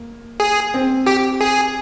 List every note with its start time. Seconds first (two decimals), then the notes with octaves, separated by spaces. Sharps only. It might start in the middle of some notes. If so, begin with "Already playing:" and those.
Already playing: A#3
0.40 G#4
0.74 C4
1.06 G4
1.41 G#4